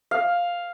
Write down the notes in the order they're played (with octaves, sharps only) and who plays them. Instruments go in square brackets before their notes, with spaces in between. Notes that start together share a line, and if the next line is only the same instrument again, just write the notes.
[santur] F5